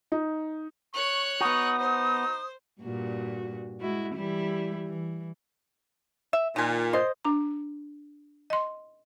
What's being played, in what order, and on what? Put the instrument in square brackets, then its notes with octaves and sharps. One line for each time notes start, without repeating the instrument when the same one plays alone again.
[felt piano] D#4
[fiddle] C#5 F#6 [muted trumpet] C#6
[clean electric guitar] B3 F#4 [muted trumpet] D#4 [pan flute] D#6
[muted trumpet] D#4 [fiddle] C5
[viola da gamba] G2 A#2 F#4
G#3 E4 F#4
E3 G3 E4
E3
[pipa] E5
[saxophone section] A#2 [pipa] D#3 G#5
[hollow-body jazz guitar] C5 D#5 [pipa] C6
[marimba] D4 A#5
D#5 C6